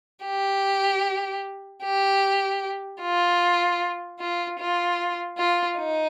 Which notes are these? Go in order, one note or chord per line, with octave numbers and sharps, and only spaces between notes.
G4
G4
F4
F4
F4
F4
D#4